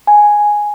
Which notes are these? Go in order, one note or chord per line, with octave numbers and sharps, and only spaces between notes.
G#5